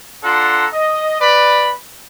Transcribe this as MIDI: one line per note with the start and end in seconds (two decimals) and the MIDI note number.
0.24 0.67 62
0.24 0.67 65
0.24 0.67 69
0.24 0.67 78
0.24 0.67 82
0.24 0.67 84
0.73 1.16 75
1.21 1.73 71
1.21 1.73 74
1.21 1.73 83